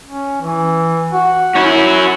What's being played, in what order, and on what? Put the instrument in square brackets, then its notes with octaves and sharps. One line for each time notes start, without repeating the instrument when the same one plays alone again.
[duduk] C#4
E3
F#4
[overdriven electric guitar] C#4 F#4 [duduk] E4